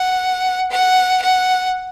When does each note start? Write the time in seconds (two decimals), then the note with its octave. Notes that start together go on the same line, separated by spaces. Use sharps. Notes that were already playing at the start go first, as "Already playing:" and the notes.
Already playing: F#5
0.70 F#5
1.22 F#5